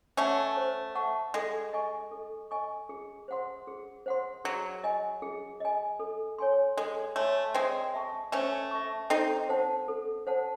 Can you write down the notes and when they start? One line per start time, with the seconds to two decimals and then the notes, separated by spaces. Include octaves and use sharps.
0.17 A3 C#4 F#5 A5 C#6
0.57 C5
0.95 F#5 A5 C#6
1.34 G#3 A4
1.73 D#5 G#5 C#6
2.11 A4
2.51 D#5 G#5 C#6
2.89 G#4
3.28 C5 F#5 C6
3.67 G#4
4.06 C5 F#5 C6
4.45 F#3 G#4
4.84 D#5 G#5
5.22 G#4
5.60 D#5 G#5
5.99 A4
6.38 C#5 G#5 C6
6.77 G#3 A4
7.16 A3 C#5 G#5 C6
7.54 G#3 C4 C5
7.94 E5 A5 C#6
8.32 A3 C#4 C5
8.71 E5 A5 C#6
9.10 C4 D#4 A4
9.49 C5 F#5 A5
9.88 A4
10.27 C5 F#5 A5